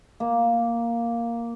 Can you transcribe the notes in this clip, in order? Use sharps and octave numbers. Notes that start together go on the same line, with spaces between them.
A#3